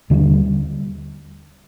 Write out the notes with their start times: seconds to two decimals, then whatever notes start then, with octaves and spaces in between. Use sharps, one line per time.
0.10 D#2 D3 G3